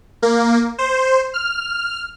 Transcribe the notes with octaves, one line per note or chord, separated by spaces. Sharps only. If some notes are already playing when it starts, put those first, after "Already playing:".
A#3
C5
F6